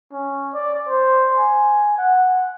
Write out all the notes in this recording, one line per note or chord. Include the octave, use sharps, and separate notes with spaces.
C#4
D5
C5
G#5
F#5